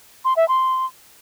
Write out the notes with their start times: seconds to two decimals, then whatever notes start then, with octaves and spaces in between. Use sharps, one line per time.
0.25 C6
0.36 E5
0.48 C6